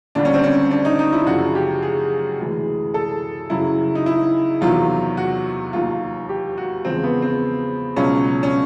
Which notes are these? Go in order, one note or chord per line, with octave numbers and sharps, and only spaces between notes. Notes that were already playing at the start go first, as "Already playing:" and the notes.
D#2 D3 G3 D4
C#4
C4
C#4
D4
D#4
D#4
E4
F#2 C#3 F3 F#4
G4
G#4
D2 C3 E3 G#3
A4
F#2 C#3 F#3 E4
D#4
E4
E2 C3 D#3 F#3 F4
F#4
D#2 D#3 F#3 F4
G4
F#4
E2 C#3 F3 G#3 C4
B3
C4
C#2 B2 F#3 C#4
C#4